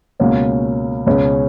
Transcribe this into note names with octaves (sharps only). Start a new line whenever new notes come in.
C#2 B2 A#3 C#4 F#4
C#2 B2 G#3 C#4